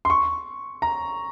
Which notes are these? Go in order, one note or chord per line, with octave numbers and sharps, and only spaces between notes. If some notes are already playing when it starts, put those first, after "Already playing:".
C6
C#6
A#5